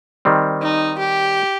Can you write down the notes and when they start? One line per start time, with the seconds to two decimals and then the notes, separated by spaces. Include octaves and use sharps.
0.25 D#3 G3 C4
0.62 D#4
0.99 G4